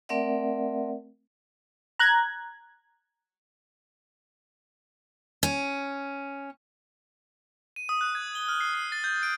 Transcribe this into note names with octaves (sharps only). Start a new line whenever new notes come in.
A3 C4 A#4 D5 E5 F#5
A#5 F#6 G#6
C#4
D#7
D#6
F#6
G#6
G7
F6
C7
C7
A6
G6
D7